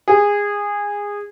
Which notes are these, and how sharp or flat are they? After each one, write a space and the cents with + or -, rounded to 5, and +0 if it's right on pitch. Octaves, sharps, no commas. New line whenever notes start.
G#4 -20